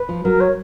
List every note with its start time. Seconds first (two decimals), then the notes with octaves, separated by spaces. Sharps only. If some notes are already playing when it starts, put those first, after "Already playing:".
Already playing: B4
0.09 F3
0.24 F#3 A#4
0.40 C#5